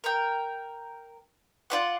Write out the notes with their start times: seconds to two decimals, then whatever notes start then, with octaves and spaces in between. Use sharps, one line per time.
0.04 A#4 G5
1.70 F4 D5 F#5